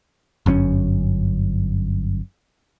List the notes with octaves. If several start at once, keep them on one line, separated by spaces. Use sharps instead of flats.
G1 F#2 C4 C#4